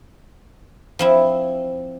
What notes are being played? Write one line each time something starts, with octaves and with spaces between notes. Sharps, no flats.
F3 C4 E4